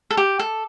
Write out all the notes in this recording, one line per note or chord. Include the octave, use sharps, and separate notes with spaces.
A4
G4
A4